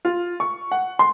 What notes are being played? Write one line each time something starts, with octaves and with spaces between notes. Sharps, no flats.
F4
C#6
F#5
C6